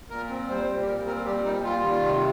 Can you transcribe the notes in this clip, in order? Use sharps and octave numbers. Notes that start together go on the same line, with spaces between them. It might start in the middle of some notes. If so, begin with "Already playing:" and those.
A#2 A#4
C4
G3 C5
A#2
G4
A#2 A#4
C4 A#4
G3 G4
A#2 D#4
G3 F4
D#3
C3